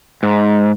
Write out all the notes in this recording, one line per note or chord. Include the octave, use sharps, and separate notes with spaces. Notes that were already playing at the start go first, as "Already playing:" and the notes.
G#2